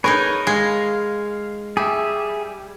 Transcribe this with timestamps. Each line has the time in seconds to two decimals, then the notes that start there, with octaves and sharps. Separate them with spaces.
0.04 D#4 G#4 A#4 B4 C#5
0.47 G#3 F5
1.77 G3 G#4 E5